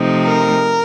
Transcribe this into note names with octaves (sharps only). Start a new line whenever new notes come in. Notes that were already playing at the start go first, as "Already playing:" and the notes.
Already playing: C3 F3 A3 C4 D#4
A#4